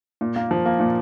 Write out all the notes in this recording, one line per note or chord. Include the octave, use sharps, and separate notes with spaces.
A#2
A#3
F3
A#3
A#2